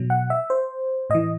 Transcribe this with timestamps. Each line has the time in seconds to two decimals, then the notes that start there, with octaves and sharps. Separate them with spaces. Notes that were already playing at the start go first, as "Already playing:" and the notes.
Already playing: B2 F#3
0.10 F#5
0.30 E5
0.50 C5
1.10 A2 E3 D#5